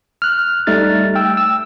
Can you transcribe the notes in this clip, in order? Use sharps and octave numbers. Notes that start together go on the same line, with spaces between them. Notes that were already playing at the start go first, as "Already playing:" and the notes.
F6 F#6
G3 A3 D#4 F6 A6
G5 E6
E6